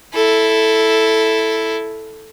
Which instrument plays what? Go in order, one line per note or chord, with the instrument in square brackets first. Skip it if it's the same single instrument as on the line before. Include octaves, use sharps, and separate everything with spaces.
[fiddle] E4 A4